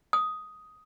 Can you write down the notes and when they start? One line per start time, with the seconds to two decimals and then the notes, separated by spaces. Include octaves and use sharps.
0.13 D#6